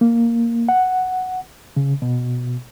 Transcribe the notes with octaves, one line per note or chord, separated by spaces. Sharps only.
A#3
F#5
C#3
B2